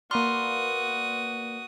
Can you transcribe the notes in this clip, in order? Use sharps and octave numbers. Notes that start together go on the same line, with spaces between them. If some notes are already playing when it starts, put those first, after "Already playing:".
A#3 F#4 B4 D5 C6 D#6 F6